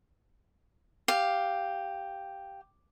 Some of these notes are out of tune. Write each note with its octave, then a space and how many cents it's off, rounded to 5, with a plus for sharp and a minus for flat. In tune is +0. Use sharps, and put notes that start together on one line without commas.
G4 +0 F5 +0